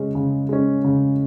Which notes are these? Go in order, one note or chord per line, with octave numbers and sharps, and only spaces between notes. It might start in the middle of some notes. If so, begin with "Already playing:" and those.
Already playing: C#3 G#3 C#4
C#3
G#3 C#4
C#3